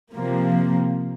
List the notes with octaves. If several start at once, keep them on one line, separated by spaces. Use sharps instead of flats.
C3 F3 A#3